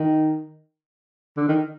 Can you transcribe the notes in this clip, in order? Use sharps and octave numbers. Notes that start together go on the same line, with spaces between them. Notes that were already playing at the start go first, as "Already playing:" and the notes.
Already playing: D#3
D3
D#3